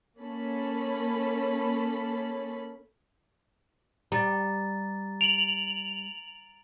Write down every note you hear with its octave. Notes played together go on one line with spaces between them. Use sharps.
A#3 C#4 A4 B5
G3 A#5 A6
D7 F7 F#7